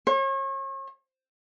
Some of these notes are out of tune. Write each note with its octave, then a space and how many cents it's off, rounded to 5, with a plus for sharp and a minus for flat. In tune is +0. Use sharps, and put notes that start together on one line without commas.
C#5 -40